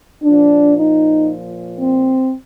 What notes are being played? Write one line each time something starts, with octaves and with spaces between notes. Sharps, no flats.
A#2 F3 D4
D#4
C4